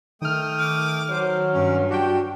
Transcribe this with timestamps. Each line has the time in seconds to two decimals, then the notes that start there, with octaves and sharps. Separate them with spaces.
0.22 D#3 A3 G5 D#6 F6
0.59 D6
1.10 F#3 C5
1.53 G2 C#4
1.91 D4 F#4 G4 G5